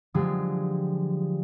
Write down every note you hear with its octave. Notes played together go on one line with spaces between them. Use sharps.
D3 F3 F#3 G#3 G4 G#4